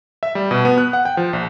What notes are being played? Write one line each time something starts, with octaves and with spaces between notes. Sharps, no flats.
E5
G3
B2
B3
F#6
F#5
G5
F3
A#1